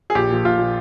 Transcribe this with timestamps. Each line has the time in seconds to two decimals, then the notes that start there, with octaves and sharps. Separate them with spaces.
0.10 G#4
0.15 A#1 G4
0.30 A#2 F3
0.44 A#1 F4
0.59 A#2 F3